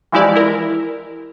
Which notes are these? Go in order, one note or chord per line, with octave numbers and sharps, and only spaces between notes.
E3 F3 G#3 E4 G4 D5
E4 A#4